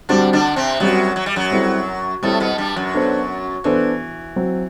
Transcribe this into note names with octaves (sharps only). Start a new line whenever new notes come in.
D3 G3 C4 D4 F#4
D3 D4
C3 C4
F#2 F#3 G3 C4 F#4
F#3
G3
F#2 F#3
G3 C4 E4 A4
A2 G3 A3 C4 E4 A4
B2 B3
G2 G3
F#2 F#3
B3 D4 A4 C5
E3 B3 D4 A4 C5
F#3 C4 F#4